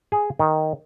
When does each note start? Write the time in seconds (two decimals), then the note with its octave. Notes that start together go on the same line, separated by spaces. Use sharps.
0.12 G#4
0.39 D#3